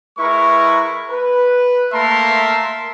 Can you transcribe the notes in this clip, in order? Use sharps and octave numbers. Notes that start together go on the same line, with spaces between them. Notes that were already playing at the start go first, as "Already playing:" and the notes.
G#3 E4 A#4 B4 C#6
B4
A3 A#3 A#4 E5 A5 C6